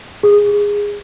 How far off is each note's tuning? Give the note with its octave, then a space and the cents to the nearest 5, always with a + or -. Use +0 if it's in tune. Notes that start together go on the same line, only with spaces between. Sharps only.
G#4 -15